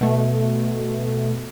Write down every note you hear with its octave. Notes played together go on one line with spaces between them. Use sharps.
B2 A3